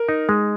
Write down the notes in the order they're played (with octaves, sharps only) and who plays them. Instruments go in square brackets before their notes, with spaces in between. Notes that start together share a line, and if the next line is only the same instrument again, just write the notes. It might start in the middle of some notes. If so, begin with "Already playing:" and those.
Already playing: [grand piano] A#4
[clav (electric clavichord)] D#4
G#3